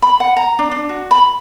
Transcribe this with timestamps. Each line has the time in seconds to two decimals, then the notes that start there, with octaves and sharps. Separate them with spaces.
0.02 B5
0.20 F#5
0.37 A#5
0.59 D4
0.71 D4
0.89 F#4
1.11 B5